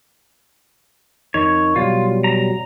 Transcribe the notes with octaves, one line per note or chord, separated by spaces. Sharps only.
F2 D#3 D#4 C#5
B2 F#3 G3 F4
A#5